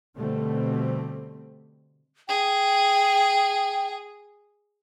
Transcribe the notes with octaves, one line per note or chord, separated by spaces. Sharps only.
B2 D3 G3 A3 C4
G#4 G5